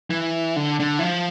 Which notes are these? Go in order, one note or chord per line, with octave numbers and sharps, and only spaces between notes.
E3
D3
D3
E3
F3